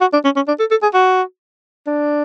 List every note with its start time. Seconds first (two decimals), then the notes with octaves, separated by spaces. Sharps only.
0.01 F#4
0.13 D4
0.24 C#4
0.36 C#4
0.47 D4
0.59 A4
0.71 A4
0.82 G#4
0.94 F#4
1.87 D4